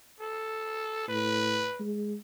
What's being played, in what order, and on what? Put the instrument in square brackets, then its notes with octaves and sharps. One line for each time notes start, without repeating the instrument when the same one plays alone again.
[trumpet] A4
[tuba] A2 [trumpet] B4
[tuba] G#3